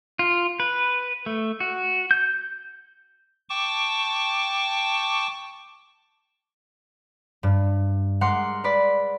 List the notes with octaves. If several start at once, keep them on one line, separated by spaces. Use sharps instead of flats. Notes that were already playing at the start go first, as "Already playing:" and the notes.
F4
B4
A3
F#4
G6
G5 A5 C#6 D6
G2
G#3 A#4 F#5 C6 D6
B4 D5 B5